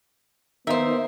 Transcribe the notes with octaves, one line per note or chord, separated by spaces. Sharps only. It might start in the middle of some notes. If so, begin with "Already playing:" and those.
D#3 A#3 B3 D#4 C5 E5